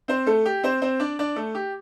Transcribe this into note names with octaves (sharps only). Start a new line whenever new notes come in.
C4 C5
A3 A4
G4
C4 C5
C4 C5
D4 D5
D4 D5
A3 A4
G4